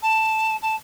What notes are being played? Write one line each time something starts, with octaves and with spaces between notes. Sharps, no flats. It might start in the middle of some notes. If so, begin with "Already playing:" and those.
A5
A5